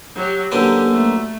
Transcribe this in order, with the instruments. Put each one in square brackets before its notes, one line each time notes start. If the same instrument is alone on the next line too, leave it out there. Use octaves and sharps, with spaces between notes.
[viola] F#3 G4
[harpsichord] F#2 D3 B3 [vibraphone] A#3 A#5 E6 [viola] G4
[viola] A3